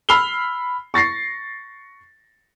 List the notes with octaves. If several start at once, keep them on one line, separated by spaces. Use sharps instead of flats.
B5 E6 F6 C7 F7 G7
C#6 A6 A#6 C7